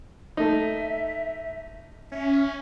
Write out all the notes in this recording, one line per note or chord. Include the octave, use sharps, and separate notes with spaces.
A3 D#4 E5
C#4 E5